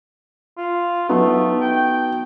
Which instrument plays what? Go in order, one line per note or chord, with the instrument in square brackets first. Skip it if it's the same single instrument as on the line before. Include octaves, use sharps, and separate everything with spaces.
[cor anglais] F4
[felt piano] F#3 B3 D#4 [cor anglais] A3
[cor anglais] G5